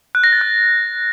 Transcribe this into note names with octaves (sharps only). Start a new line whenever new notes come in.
F#6
A#6
A6
F#6